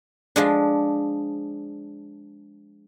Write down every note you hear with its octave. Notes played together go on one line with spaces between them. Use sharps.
F3 G#3 D4